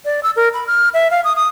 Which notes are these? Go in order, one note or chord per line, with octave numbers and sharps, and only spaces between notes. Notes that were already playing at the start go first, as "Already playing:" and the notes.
D5
E6
A#4
B5
F6
E5
F5
D#6
D#6